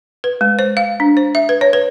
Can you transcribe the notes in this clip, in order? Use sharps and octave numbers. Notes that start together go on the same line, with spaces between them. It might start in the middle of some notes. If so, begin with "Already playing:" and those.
B4
G#3
C5
F5
D4
C5
E5
B4
C#5
B4